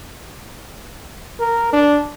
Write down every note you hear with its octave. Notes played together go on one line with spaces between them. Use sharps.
A#4
D4